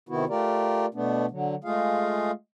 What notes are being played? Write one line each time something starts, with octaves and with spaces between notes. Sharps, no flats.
C3 D#3 B3 E4 F#4
A3 F4 G4 A#4 D5
B2 A3 B3 D4
D3 F#3
G#3 A3 F4 G#4 F5